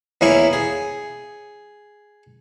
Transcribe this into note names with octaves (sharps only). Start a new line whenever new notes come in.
E2 A#3 C#4 E4 C#6
G#4